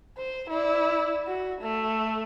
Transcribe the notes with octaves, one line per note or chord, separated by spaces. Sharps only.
C5
E4 D5
F#4
A3